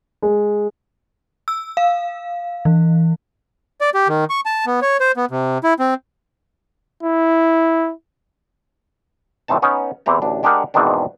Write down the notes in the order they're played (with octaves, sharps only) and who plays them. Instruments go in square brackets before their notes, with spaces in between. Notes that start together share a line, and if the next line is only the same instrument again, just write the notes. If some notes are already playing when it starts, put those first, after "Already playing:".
[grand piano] G#3
[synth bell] E6
F5
E3
[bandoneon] D5
G4
D#3
C#6
A5
B3
C#5
C5
B3
C3
E4
C4
[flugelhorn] E4
[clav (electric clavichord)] G1 A2 E3 C4 D#4 A5
B3 C#4 D#4 A#5
E2 E3 C4 G4 A#5
A1 D2 D4
G#3 D4 G4 G#4 A#4 F#5
E2 G#2 B2 D#3 C4 D4